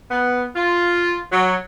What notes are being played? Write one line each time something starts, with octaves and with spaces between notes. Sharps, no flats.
B3
F4
F#3